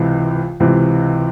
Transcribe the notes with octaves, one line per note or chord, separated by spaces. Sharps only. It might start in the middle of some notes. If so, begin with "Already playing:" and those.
Already playing: C#2 C3 E3
C#2 C3 E3